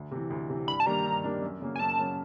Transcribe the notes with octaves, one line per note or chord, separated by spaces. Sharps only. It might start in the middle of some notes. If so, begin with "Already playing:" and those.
Already playing: D2
C3 E3
D2
C3 E3
G2 B5
A5
D#3 G3 A#3 D4 A#5
G2
D#3 G3 A#3 D4
F#2
C#3 F#3 A#3
G#5
F#2 A5
C#3 F#3 A#3